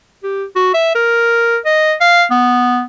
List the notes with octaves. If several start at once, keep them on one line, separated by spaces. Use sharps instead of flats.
G4
F#4
E5
A#4
D#5
F5
B3